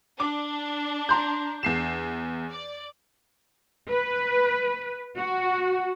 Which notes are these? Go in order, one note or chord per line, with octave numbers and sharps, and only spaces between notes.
D4 D6
A#5 C6 G6
E2 C7 E7
D5
B4
F#4